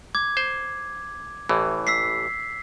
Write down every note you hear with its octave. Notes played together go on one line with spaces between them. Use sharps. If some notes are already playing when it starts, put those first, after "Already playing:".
D6 G#6
C5
A1 A2 E3
E6 B6 C7